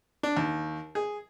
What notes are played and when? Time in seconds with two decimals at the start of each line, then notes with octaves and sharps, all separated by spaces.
0.23 D4
0.37 D#2
0.95 G#4